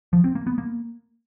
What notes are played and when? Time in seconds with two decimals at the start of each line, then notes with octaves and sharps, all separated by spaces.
0.13 F3
0.24 C4
0.35 A#3
0.47 B3
0.58 A#3